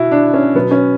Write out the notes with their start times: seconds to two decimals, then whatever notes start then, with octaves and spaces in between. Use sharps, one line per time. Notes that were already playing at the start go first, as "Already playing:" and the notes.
Already playing: B2 E4 F#4
0.11 D4
0.34 C#4
0.55 B2 F#3 B3
0.71 C#4